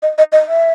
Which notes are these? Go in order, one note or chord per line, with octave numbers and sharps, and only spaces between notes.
D#5
D#5
D#5
E5